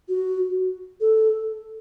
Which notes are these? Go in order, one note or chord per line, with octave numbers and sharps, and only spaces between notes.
F#4
A4